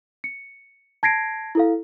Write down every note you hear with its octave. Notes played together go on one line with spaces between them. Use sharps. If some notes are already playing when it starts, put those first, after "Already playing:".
C#7
A5 G#6 A#6 C7 D7
E4 A4 F5